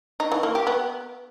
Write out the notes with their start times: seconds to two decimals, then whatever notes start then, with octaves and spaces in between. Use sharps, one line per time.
0.20 D#4
0.32 E3
0.43 A#3
0.55 G4
0.67 B3